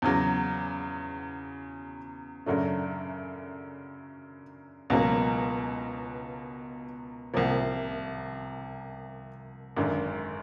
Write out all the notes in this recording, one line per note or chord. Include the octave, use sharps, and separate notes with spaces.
E2 C#3 F#3
F#2 C#3 F#3 A3 D4
C#2 B2 F#3 A#3
C2 C3 F3 A#3
G#1 F#2 D3